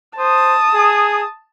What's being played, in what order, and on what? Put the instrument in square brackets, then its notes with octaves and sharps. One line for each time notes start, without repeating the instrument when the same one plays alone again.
[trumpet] C5 [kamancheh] A5 D#6
[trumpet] G#4